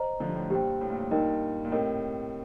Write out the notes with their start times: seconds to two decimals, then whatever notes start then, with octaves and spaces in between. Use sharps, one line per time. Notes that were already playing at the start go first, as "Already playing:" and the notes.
Already playing: C5 D#5 A#5
0.20 D3 F3
0.29 G2
0.36 A2
0.50 G2 A#2 G4 C5 G5
0.81 A2
0.90 A#2
1.00 A2
1.11 G2 A#2 D#4 A#4 D#5 G5
1.65 A#2
1.71 A2 C3 A#4 D#5 G5